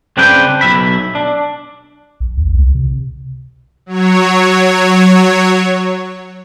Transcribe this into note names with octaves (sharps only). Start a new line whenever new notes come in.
C#3 C4 D4 B4 G5
B1 E5 B5
D4
A#1
D#2
C2
C3
F#3 C#5